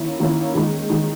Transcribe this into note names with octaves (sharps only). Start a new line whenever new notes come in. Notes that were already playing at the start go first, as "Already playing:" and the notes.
Already playing: D#3 A#3 C#4 E4
D#3 A#3 C#4 E4
D#3 G#3 D#4
D#3 G#3 D#4